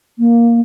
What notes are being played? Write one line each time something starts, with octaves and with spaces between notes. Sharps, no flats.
A#3